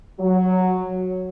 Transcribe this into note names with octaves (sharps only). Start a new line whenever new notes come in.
F#3